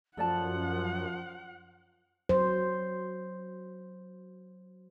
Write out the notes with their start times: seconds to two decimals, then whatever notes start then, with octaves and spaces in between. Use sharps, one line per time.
0.17 F#2 F3 A4 D5 F#5 A5
2.29 F#3 C5